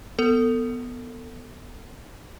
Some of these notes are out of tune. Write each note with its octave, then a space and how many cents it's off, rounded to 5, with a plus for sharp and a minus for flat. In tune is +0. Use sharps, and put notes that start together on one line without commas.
B3 +0 A4 +25